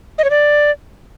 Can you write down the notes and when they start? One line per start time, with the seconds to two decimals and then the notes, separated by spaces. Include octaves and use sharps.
0.18 D#5
0.24 C#5
0.30 D5